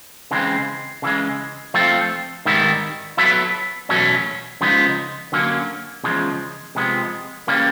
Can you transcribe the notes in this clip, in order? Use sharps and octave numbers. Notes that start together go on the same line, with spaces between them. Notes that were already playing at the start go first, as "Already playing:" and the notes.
C#3 E3 G#3 C4
C#3 E3 G#3
F3 A3 C4 F4 A4
G#2 D#3 G3 B3 E4
F#3 B3 E4 A4
E2 B2 F#3 A3 C#4
C#3 F3 G#3 B3 D#4
D3 F#3 A#3 C#4
E2 C#3 F3 G#3
C3 F3 G#3 B3
C#3 E3 G3 A#3 C#4